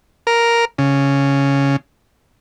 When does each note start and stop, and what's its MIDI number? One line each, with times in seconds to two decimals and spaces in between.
0.27 0.65 70
0.78 1.76 49